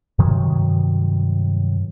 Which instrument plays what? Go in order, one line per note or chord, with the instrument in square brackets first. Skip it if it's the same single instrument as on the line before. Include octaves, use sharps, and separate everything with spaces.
[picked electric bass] G2 C3 D#3 F#3